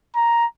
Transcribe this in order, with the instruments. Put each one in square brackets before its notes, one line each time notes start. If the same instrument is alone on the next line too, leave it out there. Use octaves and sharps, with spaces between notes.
[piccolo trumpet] A#5